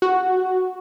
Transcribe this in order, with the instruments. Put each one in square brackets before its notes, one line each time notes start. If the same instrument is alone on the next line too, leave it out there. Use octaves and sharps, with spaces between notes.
[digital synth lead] F#4